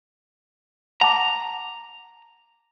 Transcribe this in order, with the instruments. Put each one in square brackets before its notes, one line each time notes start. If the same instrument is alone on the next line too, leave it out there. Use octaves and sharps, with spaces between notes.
[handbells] F#5 A5 D6 [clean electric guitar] A#5